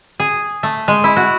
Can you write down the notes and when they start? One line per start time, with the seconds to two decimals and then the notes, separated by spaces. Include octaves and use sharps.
0.20 G#4
0.63 A3
0.88 G#3
1.04 E4
1.16 F#4